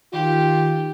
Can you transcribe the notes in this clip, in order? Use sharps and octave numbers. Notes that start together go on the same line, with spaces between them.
D#3 F4 G4